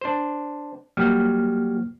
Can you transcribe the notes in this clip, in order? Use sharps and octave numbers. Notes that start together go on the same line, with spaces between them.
D4 C5
F#3 G3 A#3 F6